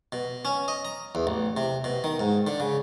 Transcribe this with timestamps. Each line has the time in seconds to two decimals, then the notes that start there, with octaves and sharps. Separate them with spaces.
0.12 B2
0.45 C#4
0.68 D#5
0.85 A#5
1.15 E2
1.27 A1
1.57 C3
1.84 B2
2.04 D#3
2.20 G#2
2.47 D3
2.60 C#3